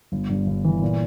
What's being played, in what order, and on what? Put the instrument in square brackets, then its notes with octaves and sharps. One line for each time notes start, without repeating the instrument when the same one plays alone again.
[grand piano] G1
G2
G1
E3
A#2